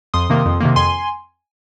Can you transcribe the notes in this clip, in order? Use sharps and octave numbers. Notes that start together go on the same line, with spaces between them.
F2 C6 D#6
C3 D#3 A#3
F2
C3 D#3 A#3
F2 G#5 C6